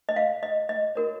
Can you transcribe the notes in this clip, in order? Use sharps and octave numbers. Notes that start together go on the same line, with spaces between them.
D#5
F5
D#5
D#5
F#4 A#4 C#5